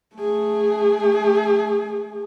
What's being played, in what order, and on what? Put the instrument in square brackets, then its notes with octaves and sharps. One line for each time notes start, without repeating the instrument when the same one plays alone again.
[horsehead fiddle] A3 G#4